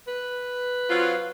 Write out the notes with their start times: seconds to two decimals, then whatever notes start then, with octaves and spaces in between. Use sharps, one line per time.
0.07 B4
0.90 F#3 C4 F4